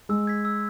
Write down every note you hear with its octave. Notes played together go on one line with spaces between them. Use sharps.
G#3 E6
G#6 B6
E6